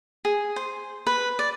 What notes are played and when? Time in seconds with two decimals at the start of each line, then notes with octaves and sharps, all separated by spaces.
0.25 G#4
0.56 C5
1.07 B4
1.39 D5